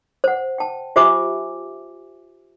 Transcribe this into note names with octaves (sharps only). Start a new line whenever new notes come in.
C5 F#5
G5 A5
F4 G4 C5 E5 G#5 D6